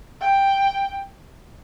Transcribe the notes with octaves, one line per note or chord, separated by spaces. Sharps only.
G5